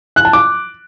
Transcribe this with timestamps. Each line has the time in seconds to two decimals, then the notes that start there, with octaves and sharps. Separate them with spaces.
0.16 F#6
0.25 A5
0.33 D6